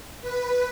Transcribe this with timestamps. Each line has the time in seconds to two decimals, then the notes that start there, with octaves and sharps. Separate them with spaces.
0.21 B4